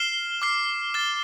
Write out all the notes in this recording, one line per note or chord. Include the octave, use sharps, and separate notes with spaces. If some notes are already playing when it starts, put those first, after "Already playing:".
Already playing: F6 C7 E7 G7
D6 F6 C7
F6 A6 E7 G7